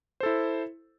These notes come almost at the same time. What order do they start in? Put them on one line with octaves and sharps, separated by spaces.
C5 A4 E4